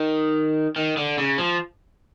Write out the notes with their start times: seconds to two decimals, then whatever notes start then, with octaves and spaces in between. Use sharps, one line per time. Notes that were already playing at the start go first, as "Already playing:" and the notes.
Already playing: D#3
0.76 D#3
0.97 D3
1.18 C#3
1.38 F3